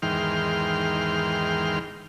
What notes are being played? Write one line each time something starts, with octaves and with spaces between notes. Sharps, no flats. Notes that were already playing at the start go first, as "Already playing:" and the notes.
E2 G#2 D#3 G5 C6 F6